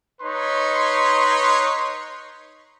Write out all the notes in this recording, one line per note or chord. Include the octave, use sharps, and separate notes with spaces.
D#4 B4 C#5 C6